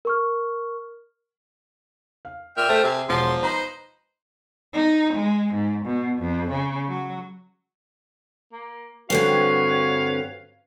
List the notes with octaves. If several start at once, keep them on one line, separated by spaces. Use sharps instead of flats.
A#4 C#6 F6
F5
A#2 E5 G5 F6
A3 C5
C3 G#4
E1 F3 C6
D#4 B4 C5 A#5
D#4
G#3
G#2
B2
F2
C#3
F#3
A#3
G2 D3 C4 F#4 B4 C#5 F5